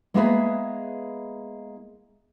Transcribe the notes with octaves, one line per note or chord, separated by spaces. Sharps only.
G#3 A#3 B3 E4 G#4 B4